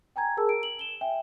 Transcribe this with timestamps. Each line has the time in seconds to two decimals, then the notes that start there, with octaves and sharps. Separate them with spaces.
0.16 G5 G#5 A#5 G#6
0.37 G#4 A#4 A5 E6
0.49 D7
0.63 F#7
0.79 E7 G7
1.01 E5 G5 G#5